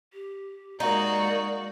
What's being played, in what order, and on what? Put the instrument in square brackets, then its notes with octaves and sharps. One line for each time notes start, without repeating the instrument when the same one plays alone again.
[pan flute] G4
[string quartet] G#3 A#3 F#4 [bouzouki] D#4 [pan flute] D5